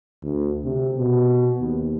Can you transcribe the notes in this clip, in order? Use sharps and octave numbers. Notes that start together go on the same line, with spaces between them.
D2
C3
B2
D#2